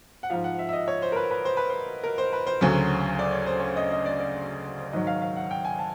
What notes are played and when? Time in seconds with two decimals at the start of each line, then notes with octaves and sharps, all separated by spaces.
0.23 F#5
0.30 G#2 F3 F5
0.44 F#5
0.59 E5
0.69 E5
0.73 D#5
0.88 C#5
1.02 C5
1.12 A#4
1.16 B4
1.31 B4
1.45 C5
1.57 B4
1.70 C5
2.04 A#4
2.18 C5
2.33 B4
2.47 C5
2.61 D2 C#3 F#3
3.19 D5
3.32 C#5
3.46 C5
3.60 C#5
3.77 D#5
3.92 D#5
4.06 D5
4.20 D5
4.92 G#2 D#3 F#3 D#5
5.07 F5
5.22 F5
5.36 F#5
5.51 G5
5.65 G#5
5.79 A5